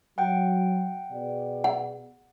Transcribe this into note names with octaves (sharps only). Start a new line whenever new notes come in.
F#3 F#5 G5
B2 G#4 D5
F#5